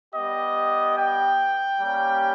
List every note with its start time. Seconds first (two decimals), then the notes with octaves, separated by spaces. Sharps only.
0.13 G3 B3 G4 D#5
0.96 G5
1.79 G3 A#3 C#4 G4